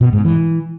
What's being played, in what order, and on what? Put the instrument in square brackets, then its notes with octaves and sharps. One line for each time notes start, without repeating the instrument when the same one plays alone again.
[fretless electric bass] B2
G#2
E3